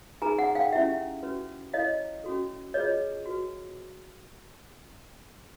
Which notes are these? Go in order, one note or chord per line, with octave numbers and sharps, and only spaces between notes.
D#4 G#4 B4 G#5 A#5
F#5 G#5
F5 G5
C#4 E4 G4 E5 F#5
C#4 F#4 B4
E4 A4 C#5 D#5 F5
C#4 F#4 A4
F4 G#4 B4 C#5 D#5
F#4 B4